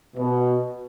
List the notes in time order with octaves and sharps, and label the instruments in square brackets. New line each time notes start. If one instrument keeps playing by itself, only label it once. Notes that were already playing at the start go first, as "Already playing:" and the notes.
[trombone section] B2